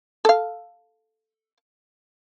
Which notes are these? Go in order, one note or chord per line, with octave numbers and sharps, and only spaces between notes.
A4 F5